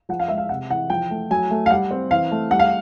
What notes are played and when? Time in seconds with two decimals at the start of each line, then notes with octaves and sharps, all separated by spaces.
0.09 F3 F#5
0.20 F5
0.28 G#3 E5
0.38 F5
0.49 C3 F#5
0.70 E3 F#5
0.90 F3 G5
1.11 A3
1.31 F#3 G#5
1.51 A3
1.66 F5
1.70 G3 F#5
1.91 C4
2.11 E3 F5
2.31 A3
2.51 G3 F#5
2.59 F5